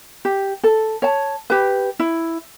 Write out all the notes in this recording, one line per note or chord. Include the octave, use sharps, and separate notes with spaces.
G4
A4
C#5 A5
G4 B4
E4